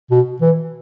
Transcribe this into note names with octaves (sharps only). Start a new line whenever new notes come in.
B2
E3